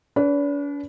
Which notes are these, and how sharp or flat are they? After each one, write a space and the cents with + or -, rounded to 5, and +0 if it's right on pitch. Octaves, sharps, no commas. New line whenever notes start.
D4 -45 B4 +0